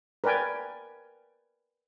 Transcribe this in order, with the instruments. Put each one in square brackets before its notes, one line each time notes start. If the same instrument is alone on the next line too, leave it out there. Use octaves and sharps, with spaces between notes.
[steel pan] A#4 B4 D5 G5 G#5